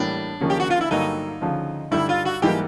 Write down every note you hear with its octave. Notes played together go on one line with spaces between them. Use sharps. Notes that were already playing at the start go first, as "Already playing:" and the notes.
Already playing: A2 E3 G3 A#3 D4
D#2 C#3 F3 A#3 C#4
G4
F#4
F4
E4
G2 D3 F#3 A#3 D#4
D2 C#3 F3
G2 D3 G3 E4
F4
F#4
G#2 E3 G3 A#3 G4